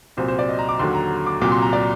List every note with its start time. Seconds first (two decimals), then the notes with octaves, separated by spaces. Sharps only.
0.17 C2 A#2 F#3 C5
0.28 C5
0.39 D5
0.49 D#5
0.59 A#5
0.69 D6
0.79 D#2 D3 F#3 C6
0.95 A#5
1.26 D6
1.41 C2 A#2 F#3 D6
1.52 C6
1.62 A#5
1.73 D5